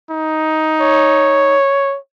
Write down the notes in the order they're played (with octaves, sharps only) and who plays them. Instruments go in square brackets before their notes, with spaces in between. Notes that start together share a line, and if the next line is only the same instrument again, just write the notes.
[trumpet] D#4
[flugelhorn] C#5